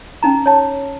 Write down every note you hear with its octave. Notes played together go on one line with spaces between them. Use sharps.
C#4 D#4 A#5
C#5 A5